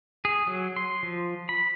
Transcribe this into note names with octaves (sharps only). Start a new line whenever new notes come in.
G#4
F#3
C6
F3
B5